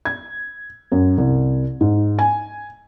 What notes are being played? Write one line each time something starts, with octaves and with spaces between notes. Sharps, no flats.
G#6
F#2
C2
G#2
G#5